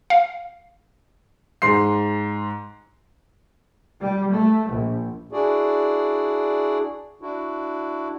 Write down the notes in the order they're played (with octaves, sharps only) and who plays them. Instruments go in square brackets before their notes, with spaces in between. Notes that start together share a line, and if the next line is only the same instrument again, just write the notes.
[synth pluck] F5
[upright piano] G#2 C6 C7
[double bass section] G3
A3
A#1
[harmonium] D4 E4 F#4 G#4 D5
D4 E4 F#4